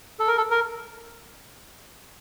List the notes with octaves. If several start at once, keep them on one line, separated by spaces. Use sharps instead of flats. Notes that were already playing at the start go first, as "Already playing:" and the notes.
A4
A#4
A4
A#4